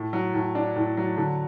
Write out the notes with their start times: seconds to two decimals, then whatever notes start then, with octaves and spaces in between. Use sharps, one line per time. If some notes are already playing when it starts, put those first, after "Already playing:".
Already playing: A2
0.13 F#3
0.34 A2
0.55 D4
0.76 A2
0.97 F#3
1.17 D3